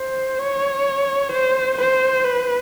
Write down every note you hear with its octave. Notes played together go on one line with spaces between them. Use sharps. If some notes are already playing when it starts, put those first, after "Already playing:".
Already playing: C5
C#5
C5
C5
B4